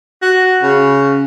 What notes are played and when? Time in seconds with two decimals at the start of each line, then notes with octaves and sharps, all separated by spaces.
0.22 F#4
0.62 C#3